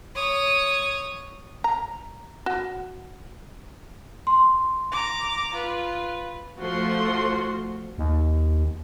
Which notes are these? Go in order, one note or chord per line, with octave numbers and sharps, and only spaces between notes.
C#5 D#6
A#5
F#4
C6
A#5 D6
F4 B4
F3 A3 F#4 C6
D#2